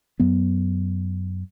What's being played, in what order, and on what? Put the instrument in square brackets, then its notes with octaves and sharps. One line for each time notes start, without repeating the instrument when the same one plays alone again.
[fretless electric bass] F#2 F#3 B3